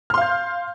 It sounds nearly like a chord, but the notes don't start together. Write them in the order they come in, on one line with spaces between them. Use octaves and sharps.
F6 C6 F5 G6